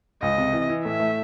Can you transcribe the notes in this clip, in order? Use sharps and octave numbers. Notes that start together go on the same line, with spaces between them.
C#2 D#5
C3
E3
E3
A2 E5
A3